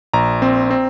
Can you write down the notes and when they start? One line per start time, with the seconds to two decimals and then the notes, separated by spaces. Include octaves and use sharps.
0.13 A#1 A#5
0.42 C4
0.71 C4